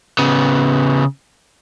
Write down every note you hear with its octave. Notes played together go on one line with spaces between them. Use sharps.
C#3 B3